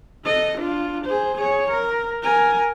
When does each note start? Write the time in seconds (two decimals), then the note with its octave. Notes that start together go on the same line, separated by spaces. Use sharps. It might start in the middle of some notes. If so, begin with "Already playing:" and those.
0.25 A4 D#5
0.58 D4 F4
1.05 G#4 C5
1.38 G#4 C#5
1.71 A#4
2.23 A#4 G#5